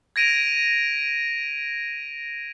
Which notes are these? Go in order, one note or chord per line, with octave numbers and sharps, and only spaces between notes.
G#6 A#6 D7 D#7 F7